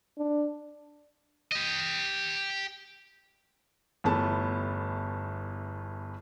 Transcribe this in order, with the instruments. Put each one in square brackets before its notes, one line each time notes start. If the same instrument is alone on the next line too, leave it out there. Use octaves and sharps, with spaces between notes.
[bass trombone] D4
[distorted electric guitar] G4 D#5
[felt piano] G1 E2 A3 B3 A5